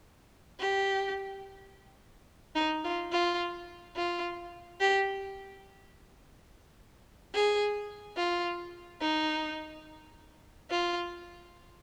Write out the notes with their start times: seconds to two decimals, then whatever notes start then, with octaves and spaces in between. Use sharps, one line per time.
0.59 G4
2.55 D#4
2.84 F4
3.12 F4
3.96 F4
4.80 G4
7.34 G#4
8.17 F4
9.01 D#4
10.70 F4